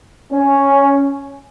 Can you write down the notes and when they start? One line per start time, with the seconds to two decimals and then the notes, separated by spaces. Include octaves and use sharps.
0.33 C#4